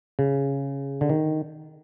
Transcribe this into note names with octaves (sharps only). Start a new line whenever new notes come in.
C#3
D3
D#3